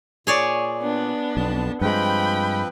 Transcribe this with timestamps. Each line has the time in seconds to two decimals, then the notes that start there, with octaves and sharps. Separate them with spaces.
0.27 A#2 G#4 C#5 D5
0.81 B3 D4
1.37 B1 F2 A5
1.81 G2 F3 G#3 C4 B4 G5 B5